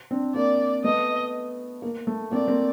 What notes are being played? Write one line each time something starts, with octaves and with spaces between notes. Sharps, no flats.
C4 D4
A#3 C4 D5
A3 B3 D#5
A#3
A3
A#3 C4 D5
A#3 C4